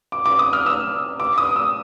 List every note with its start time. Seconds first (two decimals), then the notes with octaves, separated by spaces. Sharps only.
0.12 D6
0.26 D6
0.39 D#6
0.53 F6
0.66 E6
1.20 D6
1.38 D#6
1.56 E6